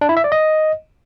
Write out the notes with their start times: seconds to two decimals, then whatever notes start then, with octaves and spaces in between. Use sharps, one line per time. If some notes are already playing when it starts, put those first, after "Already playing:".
0.01 D4
0.09 E4
0.17 E5
0.24 D5
0.32 D#5